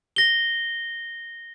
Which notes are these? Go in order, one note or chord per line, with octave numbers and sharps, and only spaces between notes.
A#6 G7